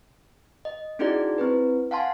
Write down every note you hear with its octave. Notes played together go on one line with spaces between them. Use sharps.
D#5
C#4 D#4 E4 F#4 G#4 D5
C4 E4 B4
F5 F#5 G#5 A5 C6